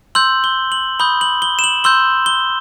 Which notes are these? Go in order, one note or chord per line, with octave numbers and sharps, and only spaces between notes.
C6 E6 G6 F#7
G7
F#7
B5 D#6 G6 G7
F#7
G7
E7
F#7
C6 E6 G6 G7
G7